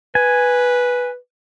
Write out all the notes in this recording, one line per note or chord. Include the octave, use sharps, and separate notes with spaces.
B4 G#5